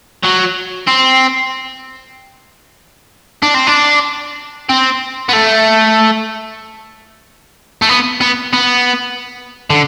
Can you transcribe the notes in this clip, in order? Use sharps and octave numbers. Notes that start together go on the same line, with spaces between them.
F#3
C4
D4
C4
D4
C4
B3
A3
A3
B3
B3
B3
D3